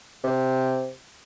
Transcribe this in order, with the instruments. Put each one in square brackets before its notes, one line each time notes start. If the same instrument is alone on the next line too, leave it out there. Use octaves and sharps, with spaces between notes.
[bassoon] C3